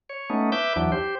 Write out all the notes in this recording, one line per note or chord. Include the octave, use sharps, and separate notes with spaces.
C#5
A3 B3 C#4 D#4
B4 E5 D6 G6
E2 E3 F#3 D4
G4 C5